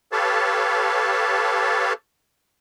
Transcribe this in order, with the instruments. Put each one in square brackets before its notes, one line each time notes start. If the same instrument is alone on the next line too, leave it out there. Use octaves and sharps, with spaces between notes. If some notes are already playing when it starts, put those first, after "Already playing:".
[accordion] G4 A4 B4 C#5 F5 A5